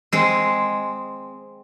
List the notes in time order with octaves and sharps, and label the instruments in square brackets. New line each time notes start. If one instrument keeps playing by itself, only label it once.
[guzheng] G#3 C4